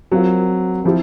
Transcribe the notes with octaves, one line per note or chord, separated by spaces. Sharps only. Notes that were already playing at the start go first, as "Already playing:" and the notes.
F#3 C4 F4 A#4
F3 C4 E4 G4